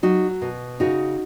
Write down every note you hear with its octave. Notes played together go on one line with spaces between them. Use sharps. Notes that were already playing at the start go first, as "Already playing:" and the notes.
F#3 D#4 F#4
B2
C#3 D#4 F#4